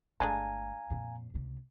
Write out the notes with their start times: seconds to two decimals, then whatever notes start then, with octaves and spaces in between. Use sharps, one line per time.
0.20 G1 G#3 A3 D4 A4 F5 G#5 A#5
0.90 F2 A#2
1.34 C#2 C3